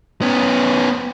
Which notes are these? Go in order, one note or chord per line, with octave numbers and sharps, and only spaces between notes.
B3 C#4